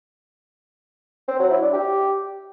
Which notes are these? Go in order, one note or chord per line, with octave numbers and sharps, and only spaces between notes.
C4
F#3
E4
D4
G4